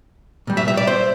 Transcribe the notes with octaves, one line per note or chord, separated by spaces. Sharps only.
A#2 G3
E5
E5
D5
C5